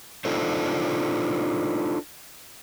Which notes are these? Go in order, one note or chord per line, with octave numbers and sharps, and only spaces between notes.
D4 D#4 F4 A4 C5